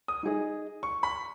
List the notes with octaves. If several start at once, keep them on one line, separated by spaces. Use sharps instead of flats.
D#6
D#4 G#4 D#5
C#6
B5